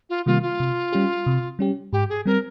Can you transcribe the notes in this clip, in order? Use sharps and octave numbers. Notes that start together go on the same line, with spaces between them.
F4
C3 D#3 G3 A#3 F4
F4
C3
G3 C#4 G4
C3
G3 C#4 G4
G#2 G4
G#4
G3 C4 A#4